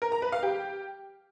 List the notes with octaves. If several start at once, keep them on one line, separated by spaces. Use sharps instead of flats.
A#4
A#5
B4
F5
G4